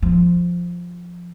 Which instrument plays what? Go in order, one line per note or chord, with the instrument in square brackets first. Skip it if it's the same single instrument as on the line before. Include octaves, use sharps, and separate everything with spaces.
[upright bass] F3